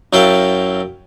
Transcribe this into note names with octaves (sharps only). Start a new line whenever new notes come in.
F#2 F#3 E4 F5 G5 A5